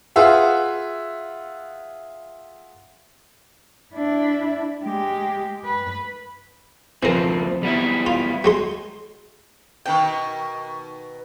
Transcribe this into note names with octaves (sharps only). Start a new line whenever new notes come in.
F4 G#4 B4 E5 F#5
D4 E4
G#3 G4
B4
C#2 E3 F3 C4 A#4
G3 B3 E4
F4
F#3 G#3 C6
B2 D#3 G5